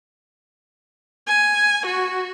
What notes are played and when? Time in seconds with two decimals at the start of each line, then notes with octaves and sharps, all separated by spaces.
1.27 G#5
1.86 F#4